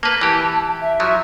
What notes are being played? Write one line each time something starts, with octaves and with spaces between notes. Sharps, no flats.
A#3 B4 A5
E3 G4
E5
F3 F#3